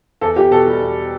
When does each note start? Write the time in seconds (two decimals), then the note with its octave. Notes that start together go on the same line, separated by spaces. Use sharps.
0.21 E2 A4
0.36 E2 G4
0.51 B2 A4
0.67 G3
0.81 E2